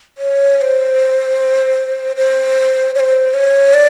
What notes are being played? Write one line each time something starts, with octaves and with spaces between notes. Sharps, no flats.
C#5
C#5
C5
C5
C#5
C5
C#5
D5